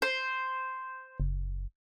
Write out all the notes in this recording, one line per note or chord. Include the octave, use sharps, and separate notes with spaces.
C5
F#1